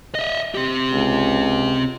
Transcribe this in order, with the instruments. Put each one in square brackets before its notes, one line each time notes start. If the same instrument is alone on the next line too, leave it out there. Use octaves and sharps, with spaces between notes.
[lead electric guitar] D#5 E5
C4 G4
[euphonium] C#2